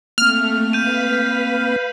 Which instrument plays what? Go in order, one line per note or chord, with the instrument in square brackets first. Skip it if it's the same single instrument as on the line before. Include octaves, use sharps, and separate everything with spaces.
[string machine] A3 [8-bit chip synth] A#3 C4 [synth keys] F6
[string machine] B4 F5 B5 [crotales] G6 D#7